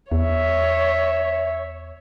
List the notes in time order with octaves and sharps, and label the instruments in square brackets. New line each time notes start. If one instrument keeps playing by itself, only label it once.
[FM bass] E2 [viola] C#5 [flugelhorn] E5